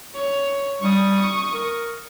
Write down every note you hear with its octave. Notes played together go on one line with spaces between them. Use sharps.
C#5
G3 C#6 D#6
A#4